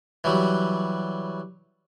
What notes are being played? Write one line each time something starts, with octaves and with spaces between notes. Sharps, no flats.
E3 F#3 G3